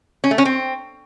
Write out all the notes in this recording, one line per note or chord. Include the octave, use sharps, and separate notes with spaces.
C#4
A3
C#4
C4